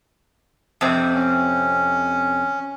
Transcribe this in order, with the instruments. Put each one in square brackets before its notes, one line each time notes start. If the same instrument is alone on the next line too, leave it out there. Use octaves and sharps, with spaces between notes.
[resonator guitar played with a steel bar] F2 C3 C4
[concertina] C#4